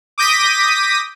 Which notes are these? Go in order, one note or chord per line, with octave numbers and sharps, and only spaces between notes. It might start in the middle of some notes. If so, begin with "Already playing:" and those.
D6 D#6 G6 A#6 B6 D#7